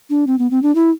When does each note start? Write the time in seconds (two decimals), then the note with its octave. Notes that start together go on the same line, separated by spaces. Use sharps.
0.10 D4
0.27 C4
0.38 B3
0.51 C4
0.63 D4
0.75 E4